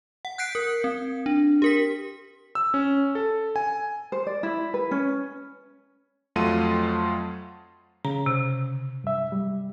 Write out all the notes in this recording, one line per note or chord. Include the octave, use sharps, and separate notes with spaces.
F#5
F#6 G6 B6 C7 D7
A#4
C4
D4
G4 A#4 B6
E6
C#4
A4
G#5
C5
D5
E4
B4
C#4
F2 F#3 A3 F4 C6 D#7
C#3 A#5
C3
G2 E5
G3